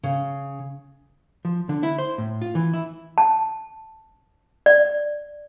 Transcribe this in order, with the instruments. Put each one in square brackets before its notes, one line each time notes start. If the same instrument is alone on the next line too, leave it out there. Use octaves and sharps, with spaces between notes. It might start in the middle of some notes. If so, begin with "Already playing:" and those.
[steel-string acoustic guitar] C#3
[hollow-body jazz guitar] F3
D3
E4
C5
A2
F4
E3
E4
[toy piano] A5
D5